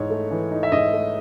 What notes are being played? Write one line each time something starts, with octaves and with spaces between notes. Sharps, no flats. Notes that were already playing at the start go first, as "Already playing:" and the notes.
Already playing: G#2 E3 D#4 C#5
A3
E3
D#4
E5
G#2 D#5
A3